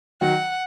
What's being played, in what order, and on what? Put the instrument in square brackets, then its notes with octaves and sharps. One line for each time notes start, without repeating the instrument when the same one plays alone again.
[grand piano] D#3 F#3 [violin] F#5